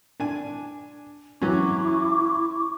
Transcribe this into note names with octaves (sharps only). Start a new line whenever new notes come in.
D4 G#5
E3 F#3 C#4 E4 C#6 D6